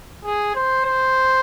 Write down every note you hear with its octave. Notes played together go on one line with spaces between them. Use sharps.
G#4
C5
C5